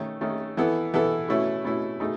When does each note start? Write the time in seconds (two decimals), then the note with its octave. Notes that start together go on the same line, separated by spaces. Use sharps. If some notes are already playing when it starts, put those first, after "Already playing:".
Already playing: D#3 A3 C#4
0.21 D#3 A3 C#4
0.57 E3 B3 E4 A4
0.94 E3 B3 E4 A4
1.28 B2 A3 C#4 E4
1.64 B2 A3 C#4 E4
2.00 B2 A3 D#4 G#4